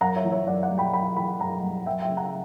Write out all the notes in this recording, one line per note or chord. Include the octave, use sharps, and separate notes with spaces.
F#2 F#5 A#5
C#5 E5
E3
C#5 E5
F#2 D5 F#5
D5 F#5
G3
G5 B5
F#2 G5 B5
E3 G5 B5
F#2 F#5 A#5
G3
F#2 E5 G5
E5 G5
C#3
F#5 A#5